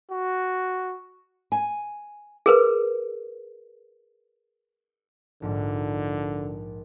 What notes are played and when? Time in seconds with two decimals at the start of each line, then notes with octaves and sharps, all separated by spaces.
0.11 F#4
1.52 G#5
2.46 G#4 A#4 B4
5.42 A#1 G#2 D3